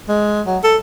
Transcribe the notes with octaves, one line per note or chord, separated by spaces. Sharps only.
G#3
F#3
A4